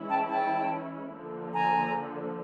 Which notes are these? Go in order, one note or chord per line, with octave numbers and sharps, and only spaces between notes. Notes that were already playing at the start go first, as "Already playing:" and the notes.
Already playing: E3 G#3 C#4 E4
G5 A5
G5 A5
D3 F3 A#3
G#5 A#5